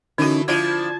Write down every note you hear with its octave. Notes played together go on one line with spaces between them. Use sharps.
D3 E3 A3 C#4 D#4 F#4
F3 D4 E4 F4 A5 G#6